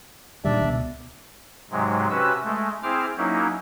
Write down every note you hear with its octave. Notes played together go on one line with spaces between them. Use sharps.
A#2 D#3 G3 D4 D5 E5
C#2 B2
G#2 C3 F#3 G#3
C3 C#4 F#4 B4 E6
G#3 A3
C4 E4 G#4 C5 D6 F6
F#3 A#3 C#4 D#4 E4